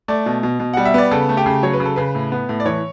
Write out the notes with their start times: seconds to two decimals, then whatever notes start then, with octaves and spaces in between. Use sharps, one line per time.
0.08 A3 D5
0.26 B2
0.43 B2
0.60 B2
0.73 G3 F#5
0.85 E5
0.94 B3 D5
1.11 C#3 A4
1.29 A3
1.37 G4
1.46 C#3
1.63 F#3 C#5
1.73 B4
1.80 C#3
1.85 A4
1.96 C#3 B4
2.15 A2
2.32 B3
2.49 A2
2.60 D5
2.65 E3 C#5